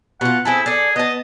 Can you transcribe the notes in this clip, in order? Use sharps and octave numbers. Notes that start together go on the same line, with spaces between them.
B2 F4 F#5
C4 E4 G#4 A4
G#4 A4 D5
B3 D#5 A5